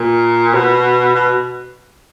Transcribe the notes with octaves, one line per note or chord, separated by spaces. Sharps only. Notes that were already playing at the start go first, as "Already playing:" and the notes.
Already playing: A#2
B2
B2